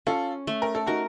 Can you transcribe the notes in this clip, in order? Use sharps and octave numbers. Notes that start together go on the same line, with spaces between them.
C#4 F4 A4
A3
A#4
A4
D#4 F#4 A#4